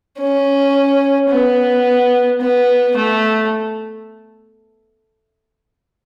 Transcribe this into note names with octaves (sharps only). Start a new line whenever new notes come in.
C#4
B3
B3
A3